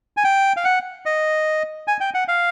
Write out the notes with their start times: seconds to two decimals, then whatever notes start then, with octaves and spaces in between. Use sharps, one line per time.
0.17 G#5
0.24 G5
0.57 F5
0.65 F#5
1.06 D#5
1.88 G#5
2.00 G5
2.14 F#5
2.28 F5